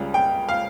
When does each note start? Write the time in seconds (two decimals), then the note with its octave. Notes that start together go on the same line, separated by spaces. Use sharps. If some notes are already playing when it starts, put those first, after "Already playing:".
Already playing: C#2 C#3 G3
0.14 G5
0.49 F5